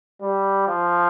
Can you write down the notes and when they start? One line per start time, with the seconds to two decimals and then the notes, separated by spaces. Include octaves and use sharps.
0.21 G3
0.68 F3